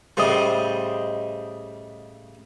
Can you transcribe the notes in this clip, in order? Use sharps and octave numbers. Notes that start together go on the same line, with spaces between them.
A2 C#3 G3 C5 D#5